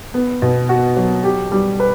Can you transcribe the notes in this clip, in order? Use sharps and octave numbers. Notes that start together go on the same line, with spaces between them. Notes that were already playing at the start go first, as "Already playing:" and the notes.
B3
B2
F#4
F#3
G4
G3
B4